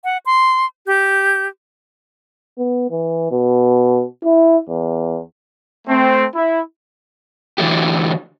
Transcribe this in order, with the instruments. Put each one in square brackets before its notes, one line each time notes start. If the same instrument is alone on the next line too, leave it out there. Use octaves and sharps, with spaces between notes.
[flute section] F#5
C6
G4 G6
[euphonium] B3
E3
B2
E4
E2
[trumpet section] A3 C4
E4
[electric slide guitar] D3 E3 F#3 A3 G4